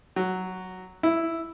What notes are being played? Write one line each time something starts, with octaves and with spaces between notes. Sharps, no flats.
F#3
E4